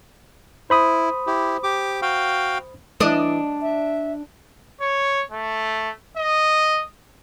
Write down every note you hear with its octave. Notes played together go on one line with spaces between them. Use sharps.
E4 C5 B5 D#6
E4 G4
G4 D6
F#4 F5 G5
E3 D4 D#5
E5
C#5
A3
D#5